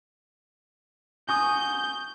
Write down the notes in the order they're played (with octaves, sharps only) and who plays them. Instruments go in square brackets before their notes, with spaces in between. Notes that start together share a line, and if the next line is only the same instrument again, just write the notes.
[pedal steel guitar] F#4 C#6 D#6 [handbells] G#5 [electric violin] G6